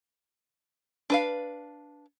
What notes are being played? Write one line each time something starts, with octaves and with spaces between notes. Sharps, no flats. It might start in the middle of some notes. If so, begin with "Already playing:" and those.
D4 B4 F5